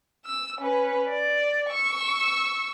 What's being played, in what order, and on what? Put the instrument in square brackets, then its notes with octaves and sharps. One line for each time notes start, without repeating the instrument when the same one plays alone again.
[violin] E6
C#4 B4
D5
C#6 E6